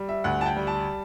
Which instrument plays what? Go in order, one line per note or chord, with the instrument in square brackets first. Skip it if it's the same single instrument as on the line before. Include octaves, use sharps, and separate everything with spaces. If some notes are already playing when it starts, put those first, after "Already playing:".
Already playing: [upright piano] G3
E5
D2 F#5
A5
G5
G3
A5